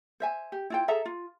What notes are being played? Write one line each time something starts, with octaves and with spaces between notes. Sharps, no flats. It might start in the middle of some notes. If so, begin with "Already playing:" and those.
C5 E5 G#5
G4
E4 F4 G5
G#4 A4 E5 A#5
F4